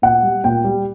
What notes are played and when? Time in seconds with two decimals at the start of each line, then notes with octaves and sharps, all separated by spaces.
0.02 A#2 F#5
0.23 G3
0.44 A#2 G5
0.64 G3